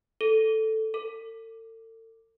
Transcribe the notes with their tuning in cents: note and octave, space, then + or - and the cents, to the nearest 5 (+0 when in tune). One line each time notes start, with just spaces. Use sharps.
A4 +0
A4 +40